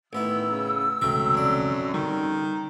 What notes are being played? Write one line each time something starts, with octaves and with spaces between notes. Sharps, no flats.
A1 D#3 B3 E4 E6
C#3
E1 C#2 F#2 C3 A3 G5
F2 D4
D3 D#3 G3